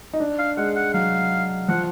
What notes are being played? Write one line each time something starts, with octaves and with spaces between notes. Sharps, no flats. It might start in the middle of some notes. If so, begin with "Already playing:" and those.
D#4
D4
F5
G#3 F#5
F#5
F#3 F5
F3 F#5